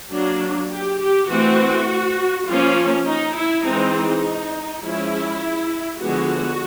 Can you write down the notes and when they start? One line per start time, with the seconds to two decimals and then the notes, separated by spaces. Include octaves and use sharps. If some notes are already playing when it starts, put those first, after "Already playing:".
0.11 F#3 A#3 D4
0.70 G4
1.00 G4
1.29 E3 A3 C4 F#4
2.47 F3 A#3 C#4 F4
3.06 D#4
3.36 E4
3.64 E3 G#3 C4 D#4
3.94 D#4
4.82 F3 G#3 C#4 E4
5.99 D3 F3 G#3 B3 F#4
6.29 F#4